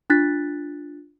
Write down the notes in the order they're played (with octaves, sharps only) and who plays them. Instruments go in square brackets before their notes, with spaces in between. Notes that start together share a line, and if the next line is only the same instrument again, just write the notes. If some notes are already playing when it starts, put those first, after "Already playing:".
[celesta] D4 F4 F#6 A6 B6